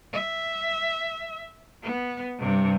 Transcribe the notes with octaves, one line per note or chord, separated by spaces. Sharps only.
E5
B3
G2 C3